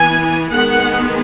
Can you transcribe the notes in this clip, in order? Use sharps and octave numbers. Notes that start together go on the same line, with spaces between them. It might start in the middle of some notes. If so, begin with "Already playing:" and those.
Already playing: E3 B3 G#5
D#3 G#3 B3 F#5